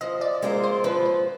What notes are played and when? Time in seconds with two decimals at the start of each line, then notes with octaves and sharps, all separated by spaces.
0.01 F3 D#5
0.21 D5
0.42 G#3 C4 F4 A#4
0.64 C5
0.84 F3 B4
1.05 C5